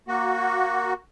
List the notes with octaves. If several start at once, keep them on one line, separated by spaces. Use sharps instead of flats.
A#3 F#4